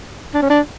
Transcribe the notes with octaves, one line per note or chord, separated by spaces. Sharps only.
D4
C#4
D4